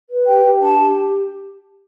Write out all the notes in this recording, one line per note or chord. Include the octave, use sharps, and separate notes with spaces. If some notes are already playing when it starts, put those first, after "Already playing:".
B4
G4 G5
G4
D4 A5
G4